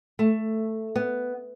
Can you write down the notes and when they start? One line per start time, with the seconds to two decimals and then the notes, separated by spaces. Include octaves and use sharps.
0.19 A3
0.96 B3